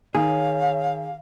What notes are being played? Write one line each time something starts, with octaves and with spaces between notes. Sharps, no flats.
D#3 G#4 C#5 F5